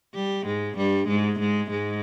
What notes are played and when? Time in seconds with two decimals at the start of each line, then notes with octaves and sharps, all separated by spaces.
0.15 G3 G4
0.46 G#2 G#3
0.77 G2 G3
1.08 G#2 G#3
1.39 G#2 G#3
1.70 G#2 G#3